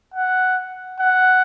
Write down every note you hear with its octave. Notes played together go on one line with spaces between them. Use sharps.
F#5
F#5